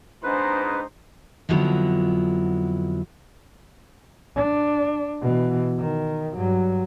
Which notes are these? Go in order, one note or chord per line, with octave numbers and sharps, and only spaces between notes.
G#2 D4 D#4 B4 C5
F2 D3 F3 F#3 B3 E4
D4
B2 E3
D#3
G2 F#3